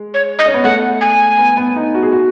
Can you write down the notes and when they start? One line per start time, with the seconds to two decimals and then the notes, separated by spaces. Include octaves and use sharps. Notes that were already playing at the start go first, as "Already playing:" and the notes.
Already playing: G#3
0.14 C#5
0.39 D#5
0.46 C#4
0.54 B3
0.64 A3 F#5
1.01 G#5
1.38 B3
1.57 B3
1.76 D#4
1.95 F#4
2.03 G#4
2.12 F#4